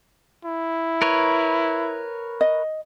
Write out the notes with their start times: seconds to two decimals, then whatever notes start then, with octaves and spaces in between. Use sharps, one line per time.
0.45 E4
1.02 A#4 B4 C#5
2.41 D#5